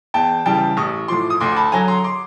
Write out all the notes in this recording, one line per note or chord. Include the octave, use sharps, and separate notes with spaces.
E2 G5 A5
C#3 E3 G3 G5 A5
A1 C#6 D#6
A2 F3 C6 D6
D#6
D2 C6 D6
A5 B5
D3 F#3 G#5 A#5
A#5 C6
C6 D6